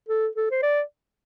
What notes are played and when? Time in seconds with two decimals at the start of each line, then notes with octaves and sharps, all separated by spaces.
0.09 A4
0.36 A4
0.51 C5
0.63 D5